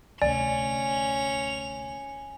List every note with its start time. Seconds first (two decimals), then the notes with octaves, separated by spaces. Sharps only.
0.22 D2 C3 C#4 D5 G#5 F7